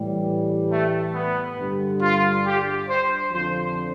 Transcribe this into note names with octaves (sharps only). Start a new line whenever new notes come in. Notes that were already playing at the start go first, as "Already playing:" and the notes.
Already playing: A2 E3 G3
A3
B3
G2 D3 G3
F4
G4
C5
F2 D3 F3 C5